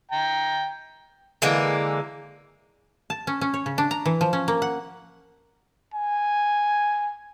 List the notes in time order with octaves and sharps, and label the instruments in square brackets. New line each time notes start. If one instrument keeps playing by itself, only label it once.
[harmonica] G5 A#5
[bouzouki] D3 E3 G#3 A#3
[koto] A5
C#4
C#4
C#5
C#3
D4
A#5
E3
F3
C#4
A#3
F#5
[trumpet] G#5